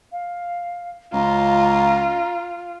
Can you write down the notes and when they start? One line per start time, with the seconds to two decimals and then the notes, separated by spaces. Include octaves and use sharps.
0.12 F5
1.13 C#2 F4 A#5